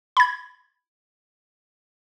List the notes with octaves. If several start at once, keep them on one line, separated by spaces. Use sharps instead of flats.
B5 G#6